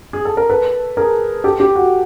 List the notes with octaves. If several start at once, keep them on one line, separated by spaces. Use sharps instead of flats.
G#4
A4
A#4
A4 B4
G#4 A#4
G4 A4
G4
F#4